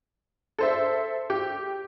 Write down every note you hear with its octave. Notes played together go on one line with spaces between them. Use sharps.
A4 C5 E5
G4